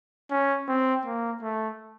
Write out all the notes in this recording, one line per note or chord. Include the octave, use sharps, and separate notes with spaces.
C#4
C4
A#3
A3